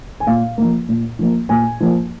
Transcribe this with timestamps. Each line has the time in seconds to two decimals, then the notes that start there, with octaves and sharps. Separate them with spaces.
0.20 G#5
0.27 A#2 F5
0.58 F3 A#3
0.89 A#2
1.19 F3 A#3
1.49 A#2 G#5
1.80 F3 A#3